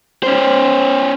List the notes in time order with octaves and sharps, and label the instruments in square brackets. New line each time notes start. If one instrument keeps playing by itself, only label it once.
[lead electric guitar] C#4 C5